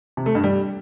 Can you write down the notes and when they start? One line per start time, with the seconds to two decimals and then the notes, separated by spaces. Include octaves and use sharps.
0.17 C3
0.26 A3
0.35 G2
0.44 G3